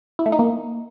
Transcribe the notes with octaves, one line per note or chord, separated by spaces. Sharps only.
E4
A3
D#4
A#3